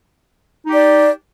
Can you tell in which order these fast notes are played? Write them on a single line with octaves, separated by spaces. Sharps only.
D#4 G4 D5